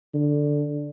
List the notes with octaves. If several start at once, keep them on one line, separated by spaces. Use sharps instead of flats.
D3